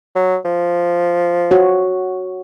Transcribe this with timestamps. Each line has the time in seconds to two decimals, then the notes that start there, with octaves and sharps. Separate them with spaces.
0.15 F#3
0.45 F3
1.51 F#4 C#5